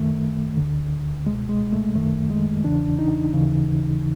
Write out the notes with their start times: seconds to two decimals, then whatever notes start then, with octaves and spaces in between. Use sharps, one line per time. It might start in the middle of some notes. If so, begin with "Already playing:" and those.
Already playing: F#2 D#3 A3
0.57 D2 D3
1.26 C#2 G#3
1.31 B2
1.49 G#3
1.73 A3
1.95 F#2 D#3 A3
2.30 G#3
2.64 E2 C#3 E3 D4
2.99 D#4
3.33 D#2 C#3 E3